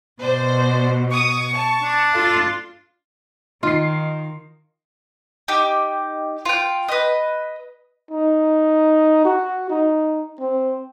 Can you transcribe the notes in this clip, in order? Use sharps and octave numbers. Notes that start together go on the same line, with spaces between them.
B2 C5 D5
C#6 D#6
A5
D4
F4 A4
D#3 D#4 F4 C7
D#4 G4
F4 G5
B4 D#5
D#4
F#4
D#4
C4